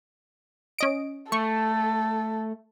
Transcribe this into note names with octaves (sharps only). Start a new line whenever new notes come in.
C#4 D#5 D7
A3 A4 C#6